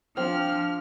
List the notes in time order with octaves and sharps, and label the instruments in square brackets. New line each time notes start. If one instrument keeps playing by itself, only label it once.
[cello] F3 [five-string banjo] C4 [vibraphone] D4 [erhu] F6